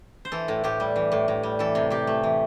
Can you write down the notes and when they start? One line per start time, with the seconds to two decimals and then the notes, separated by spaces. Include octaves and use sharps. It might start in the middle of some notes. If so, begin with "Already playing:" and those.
0.25 C5
0.32 E3 A4
0.48 A2
0.64 A2 G4
0.80 G3
0.96 E3
1.12 A2
1.28 A2
1.43 G3
1.59 E3 A4
1.75 C3
1.90 C3 G4
2.07 A3
2.23 E3